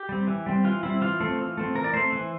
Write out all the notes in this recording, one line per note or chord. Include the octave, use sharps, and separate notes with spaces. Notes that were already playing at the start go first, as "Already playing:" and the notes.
Already playing: G4
G3 C4
E3
G3 C4
E3 F4
G3 C4 E4
E3 F4
A3 C4
E3
A3 C4
E3 A#4
D5
A3 C4 C5
E3